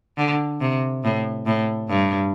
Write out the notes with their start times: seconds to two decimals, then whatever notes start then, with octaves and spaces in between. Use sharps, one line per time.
0.17 D3
0.61 C3
1.04 A2
1.47 A2
1.89 G2